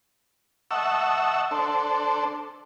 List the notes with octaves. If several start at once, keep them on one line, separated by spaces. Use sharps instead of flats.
D#5 E5 F#5 A5 C#6 E6
D4 A4 C5